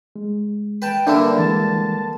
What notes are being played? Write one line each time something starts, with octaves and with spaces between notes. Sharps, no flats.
G#3
B4 G5 A5
G2 D3 A#3 D4 E5 B5 E6
E3 G#3 A5